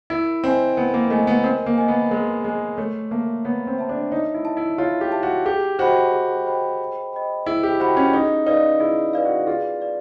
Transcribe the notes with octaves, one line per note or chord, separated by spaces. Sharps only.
E4 A#4
C4 D#5 G#5
B3 A#4
A#3
A3 D#5 G#5
B3
C4 A#4
A#3
D#5 G#5
B3
G#3 A#4
G#3 D#5 G#5
A3 C#5
A#3 E5 A5
B3 C#5
C4
E5 A5
D4
D#4 C#5
E4
E5 A5
E4
F4 C#5
G4
E5 A5
F#4
G4 G#4
F#4 C5 D#5 G5 B5
G#4
C5 D#5 G5 B5
G#4
C5 D#5 G5 B5
E4 G#4
G4
F#4 C5 D#5 G5 B5
C#4
D#4 G#4
D#4 B4 D5 F5
E4 G#4
B4 D5 F5
F#4
F4 G#4
B4 D5 F5